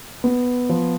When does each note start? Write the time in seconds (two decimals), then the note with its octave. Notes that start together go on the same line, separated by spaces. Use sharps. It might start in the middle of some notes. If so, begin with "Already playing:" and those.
0.24 B3
0.69 F3